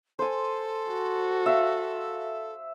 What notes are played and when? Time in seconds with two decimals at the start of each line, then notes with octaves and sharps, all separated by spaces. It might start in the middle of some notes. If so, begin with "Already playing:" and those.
0.19 A4 C5 G#5
0.90 F#4
1.46 E5 F5